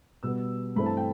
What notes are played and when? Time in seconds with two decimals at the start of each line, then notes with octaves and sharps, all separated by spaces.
0.23 B2 G3 B3 E6
0.76 G2 E3 A3 C4 B5
0.86 A5
0.97 G5